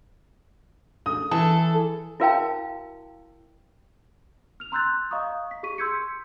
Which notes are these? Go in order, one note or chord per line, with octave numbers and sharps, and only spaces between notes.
D#6
E3 A4
E4 F#4 A#4 F5 G5 A5
F6 F7
A#5 C6 E6 F#6 G6 A6
D#5 F5 A#5 C#6 D#6
B6
G4 G#4 C#6 B6 D#7
C6 E6 G6 G#6 B6 C#7